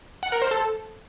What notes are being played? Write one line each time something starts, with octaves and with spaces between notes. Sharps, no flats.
F#5
A#4
C5
A4